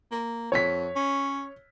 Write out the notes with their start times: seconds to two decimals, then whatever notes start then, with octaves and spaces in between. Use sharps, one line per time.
0.11 A#3
0.52 F2 C#5 B6
0.96 C#4